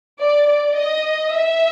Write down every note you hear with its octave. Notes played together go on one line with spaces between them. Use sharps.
D5
D5
D#5
E5